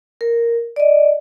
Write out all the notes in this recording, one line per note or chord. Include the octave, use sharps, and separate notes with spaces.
A#4
D5 D#5